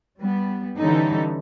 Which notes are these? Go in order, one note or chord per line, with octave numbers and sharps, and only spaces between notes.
G3 B3
D3 E3 G3 C#4 D#4 A4